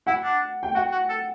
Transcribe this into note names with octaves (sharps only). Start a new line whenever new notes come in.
E4 F#5
D4
G5
F#4 F#5
F#4
A4